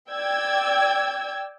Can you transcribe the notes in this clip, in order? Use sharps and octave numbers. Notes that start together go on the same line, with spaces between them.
D5 G5 E6 G#6